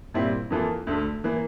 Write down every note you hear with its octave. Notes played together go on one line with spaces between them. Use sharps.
A#2 G3 C4 E4 G4
F2 E3 A#3 F4 A4
D2 D3 A3
E3 A#3